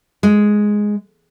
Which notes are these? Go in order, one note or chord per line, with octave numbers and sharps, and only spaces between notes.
G#3